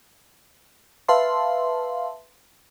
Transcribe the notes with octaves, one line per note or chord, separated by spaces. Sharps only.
B4 E5 F5 A5 C6